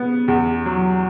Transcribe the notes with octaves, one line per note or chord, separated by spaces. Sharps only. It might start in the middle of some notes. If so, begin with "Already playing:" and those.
Already playing: C#3 B3
E2
F#3